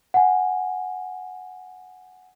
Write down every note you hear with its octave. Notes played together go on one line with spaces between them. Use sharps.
F#5 G#5